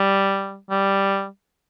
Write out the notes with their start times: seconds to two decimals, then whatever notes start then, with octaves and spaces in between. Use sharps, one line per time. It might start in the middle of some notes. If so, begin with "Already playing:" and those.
Already playing: G3
0.70 G3